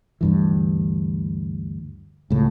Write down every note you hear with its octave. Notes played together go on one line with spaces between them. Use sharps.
D2 G2 E3
C#2 A2